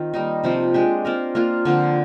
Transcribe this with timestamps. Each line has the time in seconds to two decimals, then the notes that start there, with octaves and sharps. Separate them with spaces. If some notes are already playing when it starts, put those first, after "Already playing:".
Already playing: D#3 C4 F4
0.14 G3 A#3 D#4
0.44 C3 F3 C4
0.74 G#3 D4 G4
1.05 C4 F4 A#4
1.35 A#3 D4 F4
1.65 D3 F3 C4